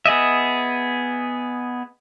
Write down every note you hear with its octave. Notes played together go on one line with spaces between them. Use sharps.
B3 G#4 D#5 E5